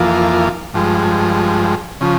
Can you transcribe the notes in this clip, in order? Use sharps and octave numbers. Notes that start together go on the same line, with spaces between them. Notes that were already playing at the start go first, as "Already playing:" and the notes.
Already playing: F2 E3 A#3 F4
G2 F3 G#3
C#3 F3